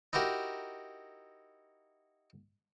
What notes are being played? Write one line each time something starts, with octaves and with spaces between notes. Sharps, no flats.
D#4 E4 F#4 G4 A#4